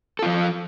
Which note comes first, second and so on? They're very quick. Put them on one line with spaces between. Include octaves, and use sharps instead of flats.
A4 F4 F3